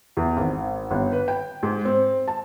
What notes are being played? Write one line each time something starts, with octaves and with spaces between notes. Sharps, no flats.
E2
G#1
G1
B4
G5
G#2
C4
A5